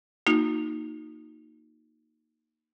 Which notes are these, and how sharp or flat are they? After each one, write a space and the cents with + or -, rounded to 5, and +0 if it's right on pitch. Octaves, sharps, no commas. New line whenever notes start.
A#3 -5 D#4 +0 F#4 -40